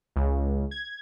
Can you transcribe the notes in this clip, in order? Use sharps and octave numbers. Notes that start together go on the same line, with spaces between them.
C#2
G#6